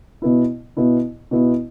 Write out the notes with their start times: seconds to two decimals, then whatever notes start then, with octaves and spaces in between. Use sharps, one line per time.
0.22 B2 B3 E4
0.77 B2 B3 E4
1.31 B2 B3 E4